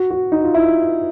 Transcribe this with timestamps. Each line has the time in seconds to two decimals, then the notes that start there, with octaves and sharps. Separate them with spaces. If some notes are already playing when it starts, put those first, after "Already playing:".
Already playing: F#4
0.10 F#4
0.32 D#4
0.44 F4
0.54 E4